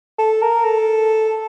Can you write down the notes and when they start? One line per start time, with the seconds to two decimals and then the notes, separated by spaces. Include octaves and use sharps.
0.18 A4
0.42 A#4
0.64 A4